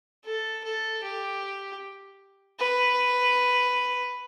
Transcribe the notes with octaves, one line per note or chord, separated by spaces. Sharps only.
A4
A4
G4
B4